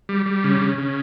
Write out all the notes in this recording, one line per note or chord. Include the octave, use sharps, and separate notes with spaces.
G3
G3
C#3
C#3
C#3